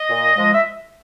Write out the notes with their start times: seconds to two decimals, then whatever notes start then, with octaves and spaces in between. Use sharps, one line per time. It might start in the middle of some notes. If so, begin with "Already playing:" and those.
Already playing: D#5
0.10 A#2
0.35 F3 G#3
0.54 E5